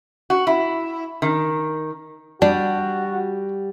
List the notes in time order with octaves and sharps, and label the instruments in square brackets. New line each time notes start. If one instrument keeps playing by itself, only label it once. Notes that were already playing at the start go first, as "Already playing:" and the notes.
[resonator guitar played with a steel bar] F#4
E4
D#3
[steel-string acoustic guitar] G3 [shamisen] D4 [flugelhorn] F#4